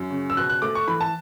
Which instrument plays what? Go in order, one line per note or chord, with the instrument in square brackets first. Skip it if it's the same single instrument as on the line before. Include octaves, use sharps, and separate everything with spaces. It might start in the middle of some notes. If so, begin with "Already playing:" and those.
Already playing: [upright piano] F#2
C#3
E6
B2 F#6
F#6
A3 D6
C#6
E3 B5
A5